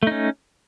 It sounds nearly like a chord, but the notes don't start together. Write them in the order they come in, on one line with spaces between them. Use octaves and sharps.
A3 D#4 C#4